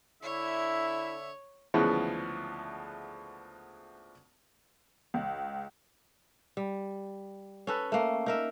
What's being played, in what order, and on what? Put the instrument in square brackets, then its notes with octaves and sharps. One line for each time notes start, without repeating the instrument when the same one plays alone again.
[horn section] D3 E5 [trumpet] E4 [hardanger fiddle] C#5
[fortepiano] D2 C#3 E3 F3 G#3 B3
[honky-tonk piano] C#2
[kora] G3
C#4 A4 B4
A3 A#3
D#4 A#4 E5